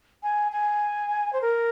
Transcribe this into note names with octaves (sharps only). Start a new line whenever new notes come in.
G#5
G#5
C5
A#4